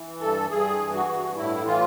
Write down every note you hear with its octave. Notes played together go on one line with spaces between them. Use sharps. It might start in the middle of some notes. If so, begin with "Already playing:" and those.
Already playing: E3
G2 A4
G2 G#4
E3
F#4
G2
A2 E4
E3 F4